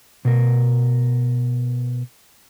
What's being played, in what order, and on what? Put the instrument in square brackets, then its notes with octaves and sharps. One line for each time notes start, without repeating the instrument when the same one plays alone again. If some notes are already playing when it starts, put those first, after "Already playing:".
[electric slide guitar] B2 A#4